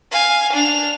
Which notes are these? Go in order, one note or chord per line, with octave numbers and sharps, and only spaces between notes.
F5 G#5
D4 F7